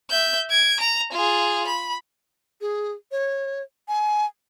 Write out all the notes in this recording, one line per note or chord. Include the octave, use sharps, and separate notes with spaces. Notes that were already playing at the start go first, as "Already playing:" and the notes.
E5 G6
G#6 D7
A#5
F4 G#4
B5
G#4
C#5
G#5